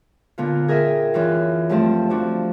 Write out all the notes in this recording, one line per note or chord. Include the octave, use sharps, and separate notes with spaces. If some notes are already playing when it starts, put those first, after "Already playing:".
A#2 D3 B3 F4
G#4 A#4 D#5 E5 G5
F#2 E3 C#4 F4
G2 F3 A3 C4 A5
F3 C4 D4 F#4